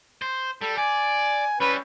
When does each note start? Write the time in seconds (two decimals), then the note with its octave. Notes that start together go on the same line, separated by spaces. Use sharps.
0.22 C5
0.62 G3 A4
0.78 D5 G#5
1.60 G3 C#4 E4 B4